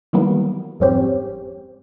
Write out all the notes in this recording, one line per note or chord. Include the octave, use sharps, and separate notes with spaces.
D#3 E3 F#3 G3 A#3 B3
G1 F2 G#2 C4 C#4 G4